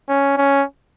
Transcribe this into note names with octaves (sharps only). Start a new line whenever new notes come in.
C#4
C#4